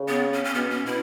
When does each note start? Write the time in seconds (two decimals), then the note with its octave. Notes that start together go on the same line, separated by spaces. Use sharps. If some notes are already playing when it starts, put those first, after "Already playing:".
Already playing: C#3
0.08 B3
0.34 C#4
0.45 C#4
0.54 B2 B3
0.70 C#4
0.86 B2 E4